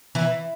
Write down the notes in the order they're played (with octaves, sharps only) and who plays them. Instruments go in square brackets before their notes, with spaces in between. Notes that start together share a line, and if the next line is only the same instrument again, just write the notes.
[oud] E3